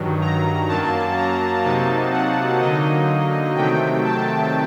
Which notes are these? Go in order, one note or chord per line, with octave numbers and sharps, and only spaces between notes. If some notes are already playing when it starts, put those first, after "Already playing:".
Already playing: G2 D#3 F#3
A#5
F#2 F#3 A#3 A5
A#5
C3 F#3 A#3 D#4 A5
F#5
D3 F#3 A#3 D#4 D#5
C3 D#3 F#3 A3 G5
A5